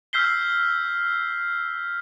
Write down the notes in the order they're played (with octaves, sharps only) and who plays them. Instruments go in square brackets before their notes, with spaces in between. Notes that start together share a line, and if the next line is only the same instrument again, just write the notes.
[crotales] E6 F6 G6 B6 C7 G7